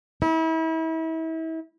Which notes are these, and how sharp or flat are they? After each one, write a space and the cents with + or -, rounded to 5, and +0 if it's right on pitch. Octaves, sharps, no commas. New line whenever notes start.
E4 -35